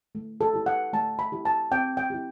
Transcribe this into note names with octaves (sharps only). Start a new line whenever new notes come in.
A3
A4
E4 G4
F#5
A3 A5
B5
E4 G4
A5
C4 G5
G5
E4 G4